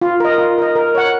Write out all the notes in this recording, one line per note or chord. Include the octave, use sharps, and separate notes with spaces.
F4
A#4 D#5
F4
A#4 D#5
A#4
C#5 F#5